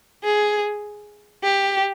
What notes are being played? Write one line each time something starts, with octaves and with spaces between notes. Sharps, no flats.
G#4
G4